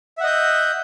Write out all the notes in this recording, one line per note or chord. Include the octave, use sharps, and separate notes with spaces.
D#5 E5 F#5 G6